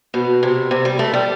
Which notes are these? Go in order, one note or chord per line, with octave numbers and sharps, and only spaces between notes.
B2
C3
C3
G3
A3
G3